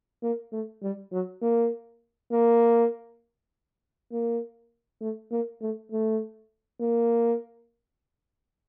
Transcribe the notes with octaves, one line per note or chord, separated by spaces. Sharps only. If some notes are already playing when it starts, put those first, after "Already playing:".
A#3
A3
G3
F#3
A#3
A#3
A#3
A3
A#3
A3
A3
A#3